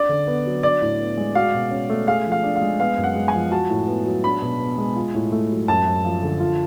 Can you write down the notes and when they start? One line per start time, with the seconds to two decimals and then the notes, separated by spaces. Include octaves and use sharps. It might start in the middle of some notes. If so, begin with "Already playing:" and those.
Already playing: D4 D5
0.09 D3
0.27 B3
0.46 F#3
0.63 D4 D5
0.82 A2
1.00 B3
1.17 G#3
1.35 F#4 F5
1.54 B2
1.71 C#4
1.90 A3
2.07 G#4 F5
2.26 F3
2.32 F5
2.43 D4
2.56 F5
2.62 G#3
2.80 B3 F5
2.98 F#2
3.04 F#5
3.16 G#3
3.28 G#5
3.33 F3
3.51 F#4 A5
3.70 A2
3.88 B3
4.06 F#3
4.24 D4 B5
4.42 B2
4.60 B3
4.78 G#3
4.96 F4
5.14 A2
5.32 A3
5.50 F#3
5.68 F#2 A5
5.87 F#2
6.04 F3
6.23 D3
6.40 F4